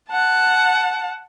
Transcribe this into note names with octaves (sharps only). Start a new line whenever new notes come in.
F#5 A5